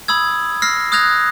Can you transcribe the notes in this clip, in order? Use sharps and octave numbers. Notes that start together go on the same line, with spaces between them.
B5 D#6 E6 G#6
E6 F6 A#6 C7
D#6 F6 F#6 G#6 A#6 F7